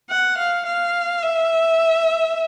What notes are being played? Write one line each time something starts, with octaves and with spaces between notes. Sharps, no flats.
F#5
F5
F5
E5